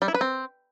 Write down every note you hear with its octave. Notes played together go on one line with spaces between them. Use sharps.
G3
E4
B4
C4